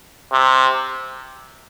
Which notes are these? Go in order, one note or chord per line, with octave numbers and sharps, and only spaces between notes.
C3